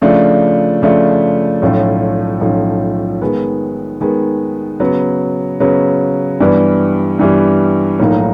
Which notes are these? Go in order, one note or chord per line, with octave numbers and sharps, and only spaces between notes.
C#3 F3 A3 D4
C#3 F3 A3 D4
B1 A2 F3 A3 C#4
B1 A2 F3 A3 C#4
D#3 G#3 B3
D#3 G#3 B3
C#3 F#3 B3
C#3 F#3 B3
G2 E3 G3 B3
G2 E3 G3 B3
B1 A2 F3 A#3 D#4